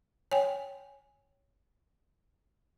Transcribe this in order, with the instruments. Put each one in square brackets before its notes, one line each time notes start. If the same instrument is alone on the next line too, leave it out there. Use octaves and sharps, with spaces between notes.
[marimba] C#5 [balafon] G5 G#5